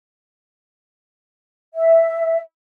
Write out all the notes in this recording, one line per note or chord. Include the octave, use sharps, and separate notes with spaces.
E5